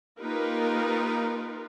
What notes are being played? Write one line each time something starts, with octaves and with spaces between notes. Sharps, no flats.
A#3 D#4 F4 G4 A#4 B4